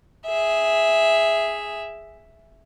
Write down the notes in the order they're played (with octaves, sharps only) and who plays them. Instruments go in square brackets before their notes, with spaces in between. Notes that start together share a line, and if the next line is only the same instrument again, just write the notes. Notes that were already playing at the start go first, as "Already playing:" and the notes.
[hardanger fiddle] G#4 E5